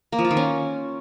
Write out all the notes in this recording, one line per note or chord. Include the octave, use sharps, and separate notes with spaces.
A#3
F3
F4
D#3
C#4